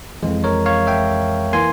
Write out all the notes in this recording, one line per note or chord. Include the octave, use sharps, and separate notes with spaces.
F2 E3 G#3
A#4 C#5
C#5 F5
E5 G5
E3 A#3 G#5 C6